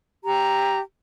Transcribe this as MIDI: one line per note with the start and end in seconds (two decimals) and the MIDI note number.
0.24 0.79 67
0.24 0.79 82